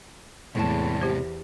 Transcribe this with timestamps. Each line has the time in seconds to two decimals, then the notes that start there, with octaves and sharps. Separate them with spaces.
0.55 E2 A2 C3 G#3 A5
1.01 G4 C5